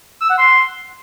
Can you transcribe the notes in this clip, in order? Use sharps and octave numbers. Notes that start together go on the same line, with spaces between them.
E6
F#5
C6